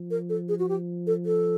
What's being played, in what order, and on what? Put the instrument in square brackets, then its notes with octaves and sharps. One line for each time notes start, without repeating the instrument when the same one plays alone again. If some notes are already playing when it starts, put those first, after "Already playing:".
Already playing: [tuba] F3
[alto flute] A#4
A4
G#4
F#4
G4
A4
A4